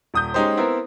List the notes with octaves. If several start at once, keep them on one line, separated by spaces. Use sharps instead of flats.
D#1 D#6 G6
G#3 C#4 D#4 G4 C5
B3 C4 E4 A#4